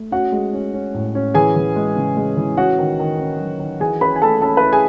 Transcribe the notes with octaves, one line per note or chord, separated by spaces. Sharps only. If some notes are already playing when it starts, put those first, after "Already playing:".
Already playing: A3
C#4 F#4 F#5
G#3
C#4
C#4
A2
C#4
E3 G#4 G#5
E3
G#3
C#3
G#3
E3
C#4 F#4 F#5
D#3
D#3
C#4
F#3
D#3
E3 G#4 G#5
C#4 B4 B5
G#5
A3 A4 A5
C#4 A4 A5
B4 B5
E4
G#4 G#5